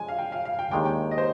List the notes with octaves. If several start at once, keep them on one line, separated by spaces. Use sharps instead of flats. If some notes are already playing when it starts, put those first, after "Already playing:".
Already playing: F3 G#3 D4 G#5
F5
G5
F5
F5
G5
D#2 D#3 G#3 D4 G5
G5
D#5
C5